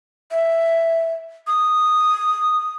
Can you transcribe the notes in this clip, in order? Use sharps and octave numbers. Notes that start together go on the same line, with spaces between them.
E5
D#6